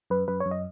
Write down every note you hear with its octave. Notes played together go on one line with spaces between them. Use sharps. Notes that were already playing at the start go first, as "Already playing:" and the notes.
F#2 B4
F#2 B4
C#5
F#2
D#5